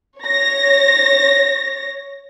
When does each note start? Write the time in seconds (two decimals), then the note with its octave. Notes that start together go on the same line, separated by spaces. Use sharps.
0.20 C#5 A#6